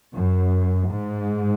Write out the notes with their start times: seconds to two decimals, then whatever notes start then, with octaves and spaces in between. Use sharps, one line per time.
0.14 F#2
0.88 G#2